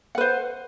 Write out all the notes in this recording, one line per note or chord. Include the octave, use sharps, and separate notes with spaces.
B4 C5 F#5